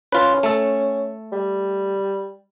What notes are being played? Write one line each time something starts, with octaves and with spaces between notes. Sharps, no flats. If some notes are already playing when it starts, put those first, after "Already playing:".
C#4 F4 B4
A3 A4
G3